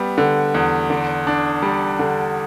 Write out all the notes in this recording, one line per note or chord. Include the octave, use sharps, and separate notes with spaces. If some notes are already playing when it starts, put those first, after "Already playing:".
Already playing: G3 B3
D3
E2
D3
D4
G3
D3